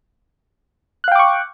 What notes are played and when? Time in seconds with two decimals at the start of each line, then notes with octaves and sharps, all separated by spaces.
1.04 F#6
1.08 F5
1.12 G5
1.15 D6
1.19 C#6